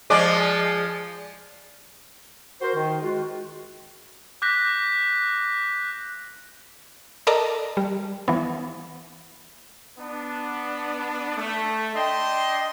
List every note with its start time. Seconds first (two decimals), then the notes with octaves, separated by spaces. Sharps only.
0.10 F3 G#3 D5
2.62 F#4 A#4 C5
2.76 D#3
3.02 G#3 F4 F#4
4.42 D6 F#6 G6 A#6 B6
7.27 A4 A#4 D5 D#5 A5 A#5
7.77 G3
8.28 E3 B3
9.98 B3 D4
11.37 A3
11.95 D4 D#5 G5 C6